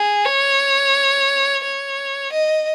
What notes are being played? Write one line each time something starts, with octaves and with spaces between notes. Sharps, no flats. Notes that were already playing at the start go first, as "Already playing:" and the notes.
Already playing: G#4
C#5
C#5
D#5